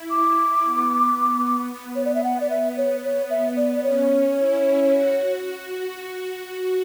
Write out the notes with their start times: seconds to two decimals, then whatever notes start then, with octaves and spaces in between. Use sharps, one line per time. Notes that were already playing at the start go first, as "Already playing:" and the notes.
Already playing: E4
0.10 D6
0.64 B3
1.96 C#5
2.05 D5
2.15 E5
2.24 B3 F#5
2.41 D5
2.50 E5
2.77 C#5
3.04 C#5
3.30 E5
3.56 D5
3.75 D5
3.83 C#4 C#5
4.37 E4
4.90 F#4